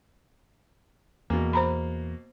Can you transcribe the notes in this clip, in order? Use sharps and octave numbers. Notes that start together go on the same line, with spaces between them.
E2 B2 A#3 B3
C5 A#5 B5